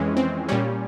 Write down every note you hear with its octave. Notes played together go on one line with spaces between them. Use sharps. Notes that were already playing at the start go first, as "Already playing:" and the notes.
Already playing: F2 E3 G#3 C#4
C4
A#2 G3 C#4